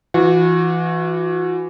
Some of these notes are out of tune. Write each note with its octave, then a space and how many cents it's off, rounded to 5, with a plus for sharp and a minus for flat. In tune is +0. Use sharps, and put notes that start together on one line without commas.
E3 +15 F#4 -30